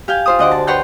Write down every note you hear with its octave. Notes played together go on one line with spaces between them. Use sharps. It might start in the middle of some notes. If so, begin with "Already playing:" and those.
G4 F5 G#5 G6
F4 C5 D#6
D2 D#5 F#5 D6
A5
B4 C#5 F#5 G5 C6 G6